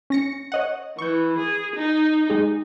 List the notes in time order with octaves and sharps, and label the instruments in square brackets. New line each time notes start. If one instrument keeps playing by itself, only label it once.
[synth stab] C#4 A#6 C#7
C#5 D#5 F#5
[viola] E3 [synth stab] C#6 G6
[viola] G#4
D#4
[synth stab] G#3 G4 G#4